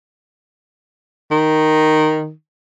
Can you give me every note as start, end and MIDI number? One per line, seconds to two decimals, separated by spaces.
1.31 2.32 51